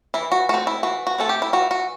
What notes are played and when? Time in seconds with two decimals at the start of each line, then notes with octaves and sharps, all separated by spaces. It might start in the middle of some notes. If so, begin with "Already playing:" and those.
0.14 E3 E4
0.32 F#4
0.49 A3 C4 F#4
0.67 E4
0.83 E3 F#4
1.07 F#4
1.18 A3 C4 A4
1.29 G4
1.42 E4
1.53 E3 F#4
1.71 F#4